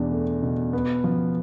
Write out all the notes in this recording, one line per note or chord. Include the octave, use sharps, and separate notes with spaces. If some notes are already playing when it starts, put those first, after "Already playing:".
Already playing: E2 B2 D4
A3
B2
B3
F3